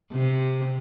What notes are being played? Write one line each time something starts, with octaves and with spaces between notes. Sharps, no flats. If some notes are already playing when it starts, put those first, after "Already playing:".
C3